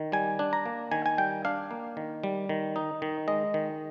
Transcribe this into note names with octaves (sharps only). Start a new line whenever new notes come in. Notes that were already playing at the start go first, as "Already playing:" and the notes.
Already playing: D#3
G3 G#5
D4
A#5
A#3
D#3 G#5
G#5
G3 G5
D4 F5
A#3
D#3
G3
D#3
D#4
D#3
G#3 D#5
D#3